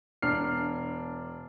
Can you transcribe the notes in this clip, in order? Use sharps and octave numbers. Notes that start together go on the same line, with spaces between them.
E1 D4 F6 C7